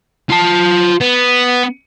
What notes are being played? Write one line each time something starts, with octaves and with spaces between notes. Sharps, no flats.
F4 A5
B3